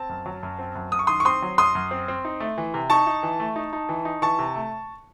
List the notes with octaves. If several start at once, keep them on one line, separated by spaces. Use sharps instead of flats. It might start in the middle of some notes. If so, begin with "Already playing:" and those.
Already playing: C4 A5
F#2
F#3
F#2
C4
F#2
F#2 D#6
C#6
D#3 C6 D#6
C#6
C4 C6 D#6
F#3
F#2 C6 D#6
F#2
C4
C4
D#4
A3
E3
C3
D#4 A5 C#6
D#4
E3
A3
D#4
D#4
E3
D#4
E3 A5 C#6
C3
A3